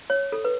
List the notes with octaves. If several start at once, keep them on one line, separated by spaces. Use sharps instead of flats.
C#5
A4
B4